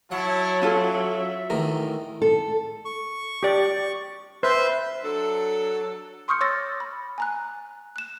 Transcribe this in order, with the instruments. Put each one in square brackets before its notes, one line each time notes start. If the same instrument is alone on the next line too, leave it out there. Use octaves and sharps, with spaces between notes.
[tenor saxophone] F#3 [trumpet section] E4 C#5 A5 [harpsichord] F#5
[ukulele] C#4 F4 A4 [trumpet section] E5
[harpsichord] E2 A2 D#3 [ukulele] A#4
[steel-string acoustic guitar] A4
[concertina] C#6
[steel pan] G4 D5
[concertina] B4 E5 [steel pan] C5
[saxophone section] F#3 D4 A4
[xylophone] C6 C#6 D#6 F6 G6 C#7
C#5 C6 D6 E6 A6 A#6
B5
G#5 A#5 F#6
F#6 E7